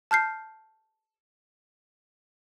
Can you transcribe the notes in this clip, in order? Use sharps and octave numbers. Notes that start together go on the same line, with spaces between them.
A5 F6 G6 C7